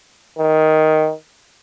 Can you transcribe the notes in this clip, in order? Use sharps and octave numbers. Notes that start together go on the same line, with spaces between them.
D#3